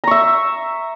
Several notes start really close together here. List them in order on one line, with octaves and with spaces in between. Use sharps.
A#5 C#6 E5